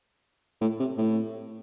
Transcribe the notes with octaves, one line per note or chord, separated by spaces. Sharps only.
A2
C3
A2